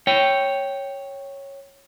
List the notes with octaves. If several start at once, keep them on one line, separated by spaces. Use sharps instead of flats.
C#5 G5